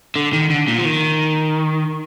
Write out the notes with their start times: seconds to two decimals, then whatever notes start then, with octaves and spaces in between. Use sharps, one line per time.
0.16 D3
0.33 D#3
0.50 D3
0.68 A#2
0.78 F3
0.85 D#3